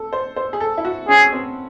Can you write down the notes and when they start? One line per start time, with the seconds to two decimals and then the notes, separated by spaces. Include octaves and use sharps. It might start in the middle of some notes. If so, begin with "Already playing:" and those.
Already playing: A4
0.13 C5
0.36 C5
0.53 G#4
0.60 A4
0.78 E4
0.85 F#4
1.08 C#4 G#4
1.33 C4